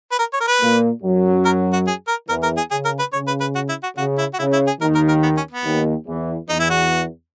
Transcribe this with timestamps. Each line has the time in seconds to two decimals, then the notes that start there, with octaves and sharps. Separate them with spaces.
0.12 B4
0.19 A#4
0.33 C#5
0.41 A#4
0.48 B4
0.61 A#2 A#3
1.03 F#2 F#3
1.45 A#4
1.73 F#4
1.87 G#4
2.08 A#4
2.29 E2 E3 A#4
2.43 A#4
2.57 G#4
2.71 C#3 G#4
2.85 A#4
2.99 B4
3.13 C#3 C#5
3.27 B4
3.41 B4
3.55 F#4
3.69 E4
3.83 F#4
3.97 C#3 F#4
4.18 E4
4.34 F#4
4.39 C#3 E4
4.53 E4
4.67 G#4
4.81 D#2 D#3 A#4
4.95 A#4
5.09 A#4
5.23 B3
5.37 C#4
5.51 B3
5.65 D#2 D#3
6.06 E2 E3
6.49 E2 E3 D#4
6.59 E4
6.70 F#4